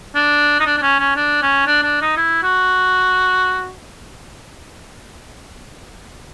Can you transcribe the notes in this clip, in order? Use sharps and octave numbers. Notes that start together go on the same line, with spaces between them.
D4
D#4
D4
D4
C#4
C#4
D4
C#4
D4
D4
D#4
E4
F#4